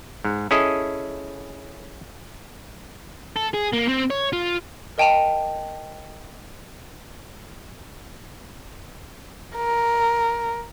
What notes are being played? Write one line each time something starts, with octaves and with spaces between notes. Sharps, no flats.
G#2
C#4 E4 G#4 A4 D#5
A4
G#4
A#3
C4
C#5
F4
A#4 D#5 G5 A5 D#7 F7
A#4